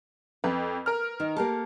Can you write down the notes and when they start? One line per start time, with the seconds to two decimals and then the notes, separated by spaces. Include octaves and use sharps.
0.44 F2 B4
0.86 A#4 F6
1.20 D#3 D#4
1.36 A#3 G4 A4